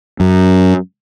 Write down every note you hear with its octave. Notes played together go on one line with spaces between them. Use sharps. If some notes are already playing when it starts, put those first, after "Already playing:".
F#2